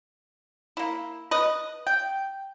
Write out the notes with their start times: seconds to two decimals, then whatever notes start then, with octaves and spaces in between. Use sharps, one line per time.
0.77 A#3 E4
1.31 B4 D#5
1.87 G5